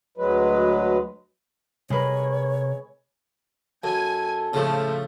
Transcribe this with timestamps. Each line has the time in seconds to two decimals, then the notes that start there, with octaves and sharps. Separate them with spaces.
0.17 D2 F#3 G#3 B4
1.90 C3 G#3 A#4 B4 C#5
3.84 F#2 A4 G#5
4.53 A2 C#3 F3 A3